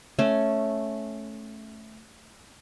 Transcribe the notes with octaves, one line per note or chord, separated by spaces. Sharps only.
A3 C#4